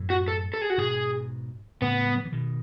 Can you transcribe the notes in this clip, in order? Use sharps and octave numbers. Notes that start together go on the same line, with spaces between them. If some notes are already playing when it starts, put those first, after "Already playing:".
Already playing: F#2 A2
F#4
A4
A4
G#4
F#4
G#2 B2 G#4
A2 C#3 B3
G#3
F#3
E3
B2 D#3